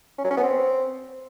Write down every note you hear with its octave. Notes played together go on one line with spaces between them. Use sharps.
C#4
F#3
C#4
B3
C4